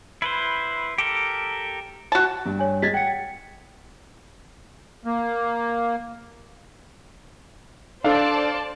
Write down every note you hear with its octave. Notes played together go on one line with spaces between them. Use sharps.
E4 B4 C5
G4 A4 A#4
F#4 A5
G2
C#5 G#5
G#3 G#6 A6 B6
F#5 G5 C#7
A#3
D4 A4 C5 D5 F5 A5